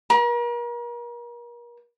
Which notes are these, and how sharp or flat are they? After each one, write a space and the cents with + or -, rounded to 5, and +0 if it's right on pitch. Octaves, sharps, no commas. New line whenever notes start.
A#4 +40